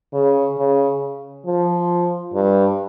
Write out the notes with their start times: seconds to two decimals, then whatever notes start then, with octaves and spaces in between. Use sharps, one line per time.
0.13 C#3
0.58 C#3
1.46 F3
2.34 G2